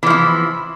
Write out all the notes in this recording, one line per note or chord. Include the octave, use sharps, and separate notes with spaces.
E3 F3 E4